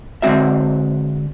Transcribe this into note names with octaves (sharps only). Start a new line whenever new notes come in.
D3 G#3 C4 F#4 E5